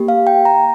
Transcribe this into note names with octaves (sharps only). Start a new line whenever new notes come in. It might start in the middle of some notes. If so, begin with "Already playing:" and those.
Already playing: A#3 G4
F5
G5
A#5